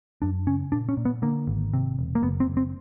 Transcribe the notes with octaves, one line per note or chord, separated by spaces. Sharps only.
F#2 D4
C#3 C#4
A#2 D4
C#4
A#2
B3
D3 A#3
G#1
C3
E1
A#3
F#1 B3
C4
F#1
C4